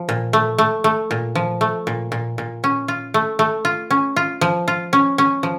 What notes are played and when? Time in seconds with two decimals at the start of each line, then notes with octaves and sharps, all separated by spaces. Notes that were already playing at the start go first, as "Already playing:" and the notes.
Already playing: F3
0.09 A#2
0.33 A3
0.58 A3
0.84 A3
1.11 A#2
1.35 F3
1.61 A3
1.87 A#2
2.12 A#2
2.38 A#2
2.64 C#4
2.88 F4
3.14 A3
3.39 A3
3.65 F4
3.90 C#4
4.16 F4
4.41 F3
4.68 F4
4.93 C#4
5.18 C#4
5.43 F3